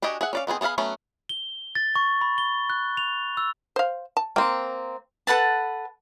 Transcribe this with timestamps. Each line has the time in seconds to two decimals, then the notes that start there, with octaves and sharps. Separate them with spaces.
0.02 D4 F#4 G4 D#5 G#5
0.21 G#4 E5 F#5
0.33 C#4 D5 F5
0.47 D#3 B3 C4 G#4
0.61 B3 G#4 A4 F5 B5
0.78 F#3 A3 B3 C#4
1.29 G7
1.75 A6
1.96 C#6
2.21 B5
2.38 G7
2.70 F#6
2.97 F7
3.37 E6
3.76 C5 F5
4.17 A5
4.36 A#3 C4 G5
5.27 A4 B4 F#5 A5